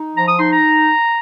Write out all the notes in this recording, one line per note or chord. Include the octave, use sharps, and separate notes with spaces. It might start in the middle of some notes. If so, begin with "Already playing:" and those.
Already playing: D#4
F3 A#5
D#6
D#4 C6
A#5